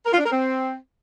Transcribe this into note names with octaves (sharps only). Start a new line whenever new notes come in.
A#4
F4
D4
A#4
C4